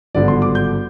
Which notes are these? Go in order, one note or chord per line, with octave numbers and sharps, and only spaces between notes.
G#1 G2 D3 F3 B3 D5
C6
D6
G6